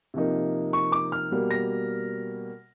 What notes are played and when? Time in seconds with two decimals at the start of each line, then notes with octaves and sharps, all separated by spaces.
0.14 C3 F3 A#3 D#4
0.73 C#6
0.92 D6
1.12 F6
1.32 B2 G3 A#3
1.51 A#6